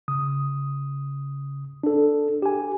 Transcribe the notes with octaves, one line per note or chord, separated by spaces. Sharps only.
C#3 D#6
D4 A4
G4 G#5